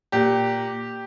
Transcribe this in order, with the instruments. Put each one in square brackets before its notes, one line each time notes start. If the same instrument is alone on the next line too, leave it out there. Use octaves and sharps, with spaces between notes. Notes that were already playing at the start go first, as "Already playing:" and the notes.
[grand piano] A#2 G4